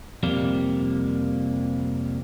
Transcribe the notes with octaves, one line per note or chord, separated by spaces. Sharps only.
F2 C3 G3 A#3